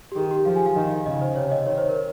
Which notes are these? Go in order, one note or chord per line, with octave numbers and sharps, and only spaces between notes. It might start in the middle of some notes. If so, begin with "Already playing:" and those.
G4
D#3 G#4
G4
F3 F5
G#5
F5
D#3 D#5
F5
C#3 D#5
C5
C3 C#5
D#5
D#3 C#5
C5
A#4